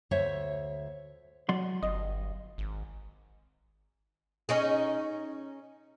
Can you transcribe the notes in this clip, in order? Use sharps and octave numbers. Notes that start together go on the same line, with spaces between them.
D2 C5 C#5 E5
F#3 D5 C6
G1 D#5
G#1
C#4 D#4 G#4